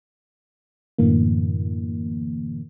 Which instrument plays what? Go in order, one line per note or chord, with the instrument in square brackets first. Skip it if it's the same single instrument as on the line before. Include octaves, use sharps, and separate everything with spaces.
[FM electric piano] F#2 A2 D3 E3 A#3